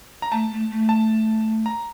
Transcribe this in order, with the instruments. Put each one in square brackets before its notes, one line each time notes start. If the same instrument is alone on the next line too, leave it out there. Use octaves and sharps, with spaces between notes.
[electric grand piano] A#5
[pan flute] A3 [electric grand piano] A5
[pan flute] A3
A3
[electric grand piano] A5
A#5